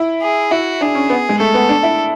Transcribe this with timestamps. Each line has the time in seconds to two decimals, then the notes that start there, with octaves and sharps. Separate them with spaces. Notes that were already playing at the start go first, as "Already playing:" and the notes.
Already playing: E4
0.22 G#4
0.51 E4 F#4
0.81 D4 G#4
0.95 C#4
1.10 B3
1.29 G#3
1.39 A3 A4
1.54 B3
1.69 D4
1.83 E4